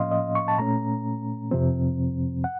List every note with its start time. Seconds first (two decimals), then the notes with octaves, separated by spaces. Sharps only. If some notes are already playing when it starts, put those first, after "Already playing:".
Already playing: A2 F3 A#3 C#4 D#5 F5 C6
0.11 D#5
0.35 C#6
0.48 A5
0.58 A#2 A3 C#4 A#5
1.51 F2 C3 F3 C4
2.44 F#5